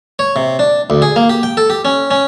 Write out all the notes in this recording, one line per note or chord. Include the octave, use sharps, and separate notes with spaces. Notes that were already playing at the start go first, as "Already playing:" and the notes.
C#5
C3
D4
D2
G#4
A#3
G4
G5
A4
G4
C#4
C#4